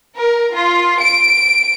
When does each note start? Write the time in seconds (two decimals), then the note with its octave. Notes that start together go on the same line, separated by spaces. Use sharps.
0.16 A#4
0.53 F4
1.01 D7